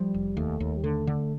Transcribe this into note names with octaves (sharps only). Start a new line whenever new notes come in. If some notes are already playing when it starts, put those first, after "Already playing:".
Already playing: F3 G3
F1
D#2 A3
D#2
G3
D3 A3
D3